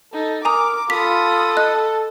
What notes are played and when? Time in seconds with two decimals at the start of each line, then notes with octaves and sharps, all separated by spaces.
0.13 D#4 A4
0.45 A#4 G#5 A#5 D6 D#6
0.90 F4 A4 B5 D#6 B6
1.57 D#5 F#6